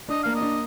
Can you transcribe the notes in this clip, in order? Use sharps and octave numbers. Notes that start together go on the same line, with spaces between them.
D4 D#5
A#3 F5
D#5
D4